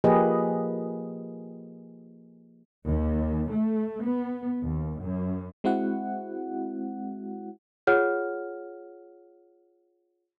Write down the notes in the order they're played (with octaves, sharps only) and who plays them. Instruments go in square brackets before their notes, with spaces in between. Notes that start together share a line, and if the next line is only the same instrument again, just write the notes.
[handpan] F3 A#3 G4 G#4 B4 D#5
[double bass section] D#2
A3
B3
D#2
F#2
[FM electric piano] G#3 C4 E4 F#4 F#5
[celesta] F4 G#4 C#5 F#5 F6